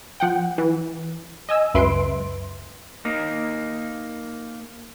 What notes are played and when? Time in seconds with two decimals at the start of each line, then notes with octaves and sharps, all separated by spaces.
0.20 F3 F#5 G5
0.58 E3
1.49 D#5 G#5 E6
1.74 C#2 F#2 B4 E5 C6 D7
3.05 A#3 D#4